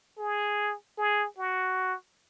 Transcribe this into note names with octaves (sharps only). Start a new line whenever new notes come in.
G#4
G#4
F#4